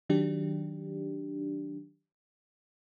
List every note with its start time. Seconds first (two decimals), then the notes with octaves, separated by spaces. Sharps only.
0.09 D#3 F#3 D4 G4